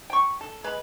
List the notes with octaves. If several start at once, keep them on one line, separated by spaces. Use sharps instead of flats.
G5 C#6
A4
G#3 B4